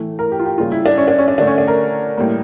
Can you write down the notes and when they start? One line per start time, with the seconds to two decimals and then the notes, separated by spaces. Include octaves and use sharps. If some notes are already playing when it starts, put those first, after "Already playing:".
Already playing: A2 E3 A3
0.19 A#4
0.32 G4
0.40 F4
0.46 G4
0.58 C#3 G3 A#3 F4
0.72 E4
0.86 D4
0.98 C#4
1.08 D4
1.19 C#4
1.28 D4
1.38 D3 D4
1.41 A3
1.47 C#4
1.58 D4
1.68 A#4
2.18 A2 G3 A#3